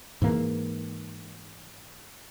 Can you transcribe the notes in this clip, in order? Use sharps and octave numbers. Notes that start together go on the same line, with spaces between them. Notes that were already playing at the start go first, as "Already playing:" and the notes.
G#2 E3 A#3